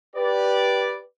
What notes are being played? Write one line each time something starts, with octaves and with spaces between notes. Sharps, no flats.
G4 B4 D5